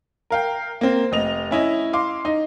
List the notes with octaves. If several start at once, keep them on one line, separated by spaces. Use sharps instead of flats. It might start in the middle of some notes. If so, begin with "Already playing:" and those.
A#4 F5 G5
A#3 C4
F1 D#5 F7
C#4 E4 D#5
F5 C6 D6
D#4